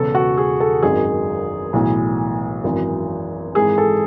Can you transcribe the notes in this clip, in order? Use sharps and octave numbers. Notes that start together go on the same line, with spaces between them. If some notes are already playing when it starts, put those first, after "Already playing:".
Already playing: E1 E2 C#3 E3 A4
F#4
G#4
A4
G#1 F#2 D#3 G#4
B1 A2 E3
G#1 F#2 E3
G#1 G#2 E3 G#4
A4